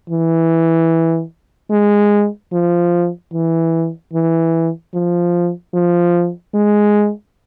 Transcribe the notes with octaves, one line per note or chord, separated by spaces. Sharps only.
E3
G#3
F3
E3
E3
F3
F3
G#3